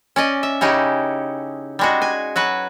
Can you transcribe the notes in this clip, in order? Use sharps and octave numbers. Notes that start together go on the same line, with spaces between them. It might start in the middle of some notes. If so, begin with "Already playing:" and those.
C#4 D5 D#5
E5
C#3 C#4 D#4 E4 G4
G3 G#3 F#4
G#5
F#3 F#4 B4